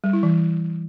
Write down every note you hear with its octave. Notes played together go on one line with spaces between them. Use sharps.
G3
E4
E3